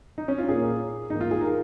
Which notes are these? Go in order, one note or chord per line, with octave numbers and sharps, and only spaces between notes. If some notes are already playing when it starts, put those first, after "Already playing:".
D#4
C#4
F4
A#2 A#3 G#4
G#2 D#3 A#3 D#4
F4
G#4
A#4